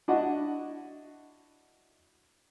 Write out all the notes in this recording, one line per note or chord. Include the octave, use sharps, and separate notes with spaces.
D4 E4 F#4 D#5 F#5